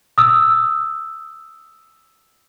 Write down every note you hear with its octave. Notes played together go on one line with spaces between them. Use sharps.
D#6 E6